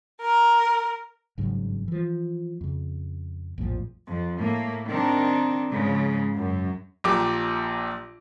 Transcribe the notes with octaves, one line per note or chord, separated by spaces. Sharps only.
A#4
G#1 G2 C#3 F#3
E3 F3
F2 C#3
A#1 F2 A2 F3
F2
A2 A#3
D#3 C4 D4
G#2 C#3 F3 G#3
F#2
A#1 A#2 G4 D6